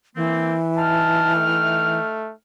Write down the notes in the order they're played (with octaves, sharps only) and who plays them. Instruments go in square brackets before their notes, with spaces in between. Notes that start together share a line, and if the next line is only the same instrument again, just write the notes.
[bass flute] E3 [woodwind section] A#3 C4
[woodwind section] D#4 G5 F6 [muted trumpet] A5
[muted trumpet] A3